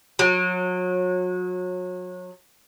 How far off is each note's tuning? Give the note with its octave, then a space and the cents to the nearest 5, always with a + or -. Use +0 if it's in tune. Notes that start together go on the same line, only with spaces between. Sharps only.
F#3 -30